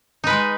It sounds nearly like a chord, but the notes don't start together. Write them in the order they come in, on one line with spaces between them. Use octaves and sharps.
D#4 B4 G#3